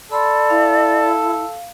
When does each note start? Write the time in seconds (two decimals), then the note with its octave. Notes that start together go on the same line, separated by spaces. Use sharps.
0.12 A4 D5 B5 C6
0.50 E4 F5